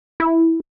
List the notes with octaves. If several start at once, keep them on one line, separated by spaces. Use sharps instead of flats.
E4